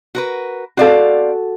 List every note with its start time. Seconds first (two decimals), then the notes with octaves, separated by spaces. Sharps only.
0.15 F#4 A#4 B4
0.77 C4 F#4 A4 D5 F5